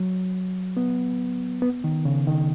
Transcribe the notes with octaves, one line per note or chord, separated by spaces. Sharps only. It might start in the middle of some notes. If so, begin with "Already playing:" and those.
Already playing: F#3
B3
B3
D#3
C#3
D#3